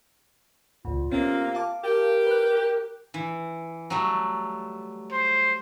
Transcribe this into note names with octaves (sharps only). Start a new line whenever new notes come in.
C#2 A#2 F4
C3 A#3 B3 C#4
F5 A5 D6
G4 A#4
B4 F#6
E3
F#3 G3 A3
C5